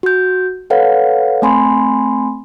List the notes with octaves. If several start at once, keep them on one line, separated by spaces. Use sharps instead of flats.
F#4 G6
A4 B4 C#5 F5 F#5
A3 C4 G#5 B5 C6